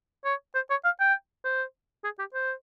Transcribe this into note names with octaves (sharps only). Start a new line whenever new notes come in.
C#5
C5
C#5
F5
G5
C5
G#4
G4
C5